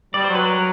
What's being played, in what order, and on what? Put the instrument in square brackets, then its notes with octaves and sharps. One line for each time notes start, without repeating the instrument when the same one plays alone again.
[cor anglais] G3 [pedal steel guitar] D5
[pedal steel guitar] C5
[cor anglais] F#3
[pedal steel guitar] B4
A#4